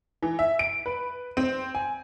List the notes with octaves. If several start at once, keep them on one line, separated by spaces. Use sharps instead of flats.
E3
E5
D7
B4
C4
G#5